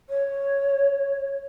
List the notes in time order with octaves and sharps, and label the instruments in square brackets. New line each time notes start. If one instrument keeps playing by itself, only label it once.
[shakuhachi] C#5